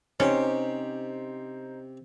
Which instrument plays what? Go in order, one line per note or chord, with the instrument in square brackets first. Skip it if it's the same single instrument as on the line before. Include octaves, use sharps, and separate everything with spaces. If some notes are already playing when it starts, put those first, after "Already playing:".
[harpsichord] C3 G4 [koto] C#4 [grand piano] D#4 C5